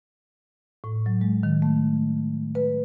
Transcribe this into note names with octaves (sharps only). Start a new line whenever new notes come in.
A2
F#3
G#3
D#3
A3
B4